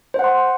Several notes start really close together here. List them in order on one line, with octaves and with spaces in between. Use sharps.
C5 F#5 C6